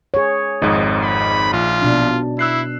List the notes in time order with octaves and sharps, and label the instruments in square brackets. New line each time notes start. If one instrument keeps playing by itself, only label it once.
[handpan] G#4 C#5
[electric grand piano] G#1 F2 G#2 [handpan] D#4 D#5
[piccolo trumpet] B5
[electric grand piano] A#1 [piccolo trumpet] F4
[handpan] B2 D4
[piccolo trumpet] E4 [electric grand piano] E6 F#6 C7